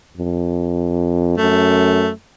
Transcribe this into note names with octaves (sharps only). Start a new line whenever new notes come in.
F2
F#2 A3